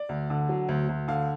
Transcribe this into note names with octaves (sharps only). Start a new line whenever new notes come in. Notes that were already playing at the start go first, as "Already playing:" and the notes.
Already playing: D5
D2
D3
F#3
D2
D2
D3 F5